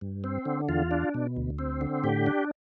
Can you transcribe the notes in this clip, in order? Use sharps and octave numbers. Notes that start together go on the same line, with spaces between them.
G2
C4
D3
E2 F4
D4
B2
D2
C4
D3
A2 G4
D4